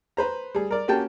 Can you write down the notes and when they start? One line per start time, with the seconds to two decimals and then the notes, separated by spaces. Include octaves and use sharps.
0.17 B4 C5 A#5
0.54 G3 G#4
0.71 A#4 D5
0.88 A#3 C#4 F#4 G4 G5 A5